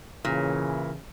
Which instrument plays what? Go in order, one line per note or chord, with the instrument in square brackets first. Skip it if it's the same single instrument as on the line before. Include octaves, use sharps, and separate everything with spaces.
[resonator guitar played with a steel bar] A#2 [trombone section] C#3 E3